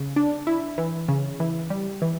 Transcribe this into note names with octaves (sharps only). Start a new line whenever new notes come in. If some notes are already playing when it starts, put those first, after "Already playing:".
Already playing: C#3
D4
E4
E3
C#3
E3
G3
E3